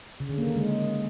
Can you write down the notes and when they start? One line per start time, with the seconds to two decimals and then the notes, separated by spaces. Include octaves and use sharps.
0.20 C#3
0.29 D3
0.38 A#3
0.47 D#3
0.56 G#3